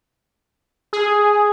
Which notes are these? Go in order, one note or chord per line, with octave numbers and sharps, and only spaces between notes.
G#4